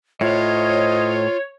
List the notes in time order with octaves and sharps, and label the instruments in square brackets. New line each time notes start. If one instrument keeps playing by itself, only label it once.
[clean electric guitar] A2 [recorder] F4 [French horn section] C5 D#5 [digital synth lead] C#5